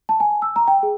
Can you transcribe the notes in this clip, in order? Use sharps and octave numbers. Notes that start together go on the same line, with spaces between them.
A5
G#5
E6
A#5
G5
G#4